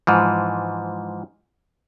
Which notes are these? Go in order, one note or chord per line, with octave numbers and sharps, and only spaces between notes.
G#2 E3 F3